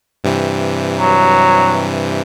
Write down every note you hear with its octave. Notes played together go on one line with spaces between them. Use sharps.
G2 C3 E3
F#3